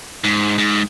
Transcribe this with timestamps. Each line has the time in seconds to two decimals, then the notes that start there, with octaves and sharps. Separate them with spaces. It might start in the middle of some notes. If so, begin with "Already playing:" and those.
0.24 G#2
0.58 G#2